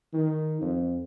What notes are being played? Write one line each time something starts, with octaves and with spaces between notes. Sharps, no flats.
D#3
F2